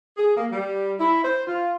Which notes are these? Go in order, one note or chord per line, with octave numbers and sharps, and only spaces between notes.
G#4
A#3
G3
E4
C5
F4